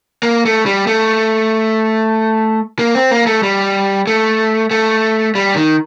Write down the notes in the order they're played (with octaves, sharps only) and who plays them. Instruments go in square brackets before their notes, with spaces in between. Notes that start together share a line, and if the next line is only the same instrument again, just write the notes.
[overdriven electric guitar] A#3
A3
G3
A3
A#3
C4
A#3
A3
G3
A3
A3
G3
D#3